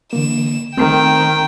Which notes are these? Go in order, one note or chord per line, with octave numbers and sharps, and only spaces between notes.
D3 E3 A#3 E7
D#3 A3 C4 G5